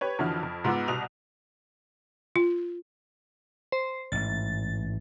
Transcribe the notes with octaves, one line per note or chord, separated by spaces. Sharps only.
G4 B4 C#5
F2 D3 E3 F3 F#4 F6
F2
G#2 G#3 B3 F4 D6 E6
C2 B2 D#6 F7
F4
C5
A1 G#2 A6